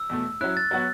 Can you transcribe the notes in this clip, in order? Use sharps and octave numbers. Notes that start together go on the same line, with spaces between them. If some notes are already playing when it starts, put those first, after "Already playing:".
Already playing: E6
E2 B2 A3
F#3 C#4 E4 F#6
A6
F#3 B3 F#4 C#5